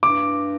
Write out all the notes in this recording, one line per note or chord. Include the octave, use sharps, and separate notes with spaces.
G2 D6